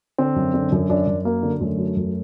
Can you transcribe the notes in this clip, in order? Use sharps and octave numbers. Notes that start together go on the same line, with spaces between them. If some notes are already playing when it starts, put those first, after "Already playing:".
D3 C4
F#2
D3
F#2
F#2 D4
F#2
F#3 A#3
D3
F#2 A3
F#3
F#2